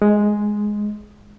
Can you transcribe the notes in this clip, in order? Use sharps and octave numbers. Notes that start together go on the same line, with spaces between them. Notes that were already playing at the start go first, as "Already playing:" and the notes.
G#3